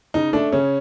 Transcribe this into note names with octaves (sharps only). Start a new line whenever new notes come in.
C#3 D#4
A3 D4
C#3 C#4